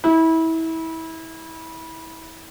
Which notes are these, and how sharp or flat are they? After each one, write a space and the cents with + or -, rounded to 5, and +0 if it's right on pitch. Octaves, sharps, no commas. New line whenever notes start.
E4 -25